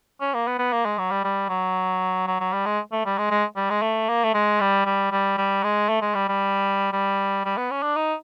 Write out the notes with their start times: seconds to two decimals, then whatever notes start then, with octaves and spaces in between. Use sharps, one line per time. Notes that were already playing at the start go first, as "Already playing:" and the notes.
0.21 C#4
0.34 A#3
0.47 B3
0.59 B3
0.72 A#3
0.85 G#3
0.98 F#3
1.11 G3
1.24 G3
1.49 F#3
2.27 F#3
2.40 F#3
2.53 G3
2.66 G#3
2.92 A3
3.06 G3
3.18 G#3
3.31 G#3
3.56 G3
3.70 G#3
3.82 A3
4.09 A#3
4.24 A3
4.34 G#3
4.61 G3
4.85 G3
5.12 G3
5.37 G3
5.64 G#3
5.89 A3
6.02 G#3
6.15 G3
6.29 G3
6.93 G3
7.45 G3
7.57 B3
7.71 C#4
7.83 D4
7.96 D#4